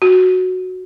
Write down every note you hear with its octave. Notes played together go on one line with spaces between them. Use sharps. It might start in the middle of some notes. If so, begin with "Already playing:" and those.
F#4